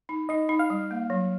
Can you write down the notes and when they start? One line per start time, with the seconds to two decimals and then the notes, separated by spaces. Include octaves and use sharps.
0.09 D#4
0.29 D#4 D#5
0.49 D#4
0.59 F5
0.70 G3
0.91 A#3
1.10 F#3